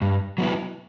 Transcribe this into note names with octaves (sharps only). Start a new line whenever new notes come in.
G2
F#3 B3 E4